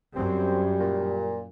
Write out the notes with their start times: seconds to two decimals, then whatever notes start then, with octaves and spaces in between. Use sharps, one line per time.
0.15 F#2 G3 C4
0.79 A#2